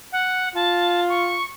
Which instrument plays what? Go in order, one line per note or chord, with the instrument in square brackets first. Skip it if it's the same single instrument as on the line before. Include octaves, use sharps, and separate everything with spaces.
[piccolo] F#5
[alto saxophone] F4 [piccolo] A5
[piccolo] C#6